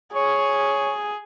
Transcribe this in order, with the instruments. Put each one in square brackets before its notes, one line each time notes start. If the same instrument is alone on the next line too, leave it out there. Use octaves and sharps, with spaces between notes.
[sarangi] G#4 [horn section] C#5